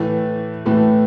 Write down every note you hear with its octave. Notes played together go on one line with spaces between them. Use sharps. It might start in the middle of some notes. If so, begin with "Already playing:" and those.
Already playing: A2 E3 A3
A2 E3 A3